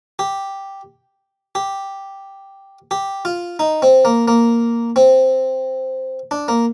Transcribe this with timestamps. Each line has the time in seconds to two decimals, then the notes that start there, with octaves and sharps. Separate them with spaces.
0.19 G4
1.55 G4
2.91 G4
3.25 F4
3.59 D#4
3.82 C4
4.05 A#3
4.28 A#3
4.96 C4
6.31 D4
6.48 A#3